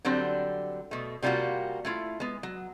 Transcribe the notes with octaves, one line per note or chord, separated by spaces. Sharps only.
D3 F#3 G3 C4 D4
B2 A3
C3 G3 A#3 F4 F#4
A3 E4 F4
G#3 B3
F#3